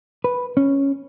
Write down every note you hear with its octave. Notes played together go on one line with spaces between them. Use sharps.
B4
C#4